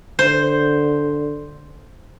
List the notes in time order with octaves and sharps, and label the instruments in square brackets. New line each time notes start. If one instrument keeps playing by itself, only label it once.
[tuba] D3 [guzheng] C5